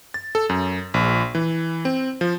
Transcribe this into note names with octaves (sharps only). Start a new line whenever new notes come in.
A6
A4
F#2
A#1
E3
C4
F3